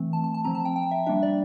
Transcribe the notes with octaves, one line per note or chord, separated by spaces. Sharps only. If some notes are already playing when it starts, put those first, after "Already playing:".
Already playing: E3 A3 C4
A5
A5
A5
F3 C4 A#5
A5
G5
G5
E5
G3 A#3 D4 E5
D5